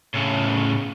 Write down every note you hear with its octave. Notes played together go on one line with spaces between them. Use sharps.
A2 C#3